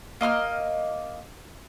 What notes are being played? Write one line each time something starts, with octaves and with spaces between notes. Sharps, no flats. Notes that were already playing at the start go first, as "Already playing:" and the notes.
A#3 D#5 C6 F6